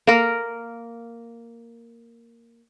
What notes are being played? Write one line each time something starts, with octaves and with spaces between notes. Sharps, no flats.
A#3 A#4